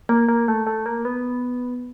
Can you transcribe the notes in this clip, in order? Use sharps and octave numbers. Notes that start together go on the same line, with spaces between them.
A#3
A#3
A3
A3
A#3
B3